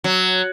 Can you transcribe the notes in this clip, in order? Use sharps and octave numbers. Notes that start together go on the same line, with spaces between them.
F#3